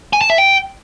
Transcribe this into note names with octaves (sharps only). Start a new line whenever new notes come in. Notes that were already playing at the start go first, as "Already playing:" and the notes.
G#5
A5
E5
G5